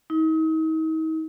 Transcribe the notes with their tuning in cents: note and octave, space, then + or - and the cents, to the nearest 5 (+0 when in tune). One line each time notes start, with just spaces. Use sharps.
D#4 +40